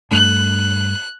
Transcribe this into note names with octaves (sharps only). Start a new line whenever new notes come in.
G2 A3 D4 F#6